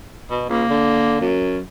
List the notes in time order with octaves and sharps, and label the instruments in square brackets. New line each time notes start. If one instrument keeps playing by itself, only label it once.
[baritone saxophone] B2
[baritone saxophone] C#2 [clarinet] A#3
[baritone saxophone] D3
F#2